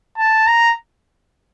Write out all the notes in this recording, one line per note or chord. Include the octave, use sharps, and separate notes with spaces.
A5
A#5